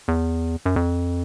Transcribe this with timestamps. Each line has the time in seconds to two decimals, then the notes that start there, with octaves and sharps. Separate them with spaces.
0.08 E2
0.66 F#2
0.76 F2